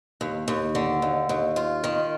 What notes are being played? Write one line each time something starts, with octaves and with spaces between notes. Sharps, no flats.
D#2
D#2
D3
D#2
D#2
F4
D#3